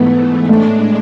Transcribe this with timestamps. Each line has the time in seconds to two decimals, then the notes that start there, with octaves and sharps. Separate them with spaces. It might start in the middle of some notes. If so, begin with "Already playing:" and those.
Already playing: G#2 E3 A3 B3
0.49 A2 G#3 A3 D4